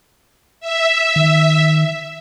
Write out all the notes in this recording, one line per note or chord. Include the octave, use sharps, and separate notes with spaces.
E5
D#3